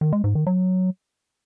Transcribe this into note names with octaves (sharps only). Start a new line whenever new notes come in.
D#3
G#3
G#2
D#3
F#3